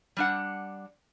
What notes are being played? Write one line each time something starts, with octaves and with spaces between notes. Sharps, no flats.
G3 D4 F#5